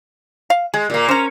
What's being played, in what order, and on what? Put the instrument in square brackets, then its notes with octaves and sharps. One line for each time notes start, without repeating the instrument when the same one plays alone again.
[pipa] F5
[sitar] G#3 [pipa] G#4
[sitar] A#2 A#3
[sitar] C#4 [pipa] C5 A#5